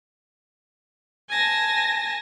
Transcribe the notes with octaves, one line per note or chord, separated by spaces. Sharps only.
G#5 A5 A#6